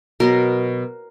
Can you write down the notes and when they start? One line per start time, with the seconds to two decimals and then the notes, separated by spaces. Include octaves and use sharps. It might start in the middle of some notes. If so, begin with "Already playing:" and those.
0.20 B2 F#3 B3 A#4